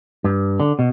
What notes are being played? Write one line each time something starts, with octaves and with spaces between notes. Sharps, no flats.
G2
D3
B2